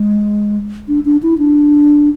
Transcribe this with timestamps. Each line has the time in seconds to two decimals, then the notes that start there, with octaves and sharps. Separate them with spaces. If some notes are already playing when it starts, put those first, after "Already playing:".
Already playing: G#3
0.88 D4
1.05 D4
1.23 E4
1.38 D4